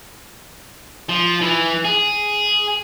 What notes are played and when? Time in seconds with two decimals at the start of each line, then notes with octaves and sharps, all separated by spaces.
1.09 F3
1.41 E3
1.85 G#4